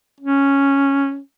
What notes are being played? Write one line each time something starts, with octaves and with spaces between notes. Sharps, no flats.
C#4